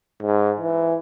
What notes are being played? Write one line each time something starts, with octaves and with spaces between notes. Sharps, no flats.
G#2
E3